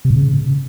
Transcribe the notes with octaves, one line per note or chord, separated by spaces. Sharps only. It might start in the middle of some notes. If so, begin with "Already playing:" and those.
C3
A2
C#3